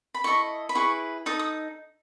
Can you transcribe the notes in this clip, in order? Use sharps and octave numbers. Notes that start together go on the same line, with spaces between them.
B5
E4 A4 D#5 C#6
B5
E4 G#4 B4 C#6
D#4 A4 D#6
D#6